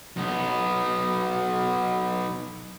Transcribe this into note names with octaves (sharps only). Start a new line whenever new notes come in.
B1 B3